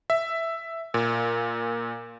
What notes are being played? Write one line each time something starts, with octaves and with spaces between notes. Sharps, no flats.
E5
A#2